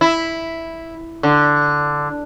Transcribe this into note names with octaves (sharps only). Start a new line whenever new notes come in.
E4
D3